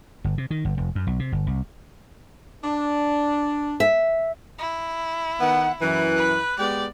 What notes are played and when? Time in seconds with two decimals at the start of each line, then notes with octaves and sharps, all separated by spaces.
0.24 G1
0.38 C3
0.51 D#3
0.65 G1
0.78 F1
0.95 F#2
1.07 B1
1.19 C3
1.32 G1
1.47 C2
2.64 D4
3.80 E5
4.59 E4
5.40 D#3 B3 F#5
5.81 F#2 E3 F#6
6.17 B4
6.59 G#3 B3 G4 D5